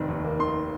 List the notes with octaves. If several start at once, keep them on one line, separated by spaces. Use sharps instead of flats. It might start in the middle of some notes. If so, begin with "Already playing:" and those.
Already playing: F1 D#3 C4
D#2
A#3
D#3 C6